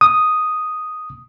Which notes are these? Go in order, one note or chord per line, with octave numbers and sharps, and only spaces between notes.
D#6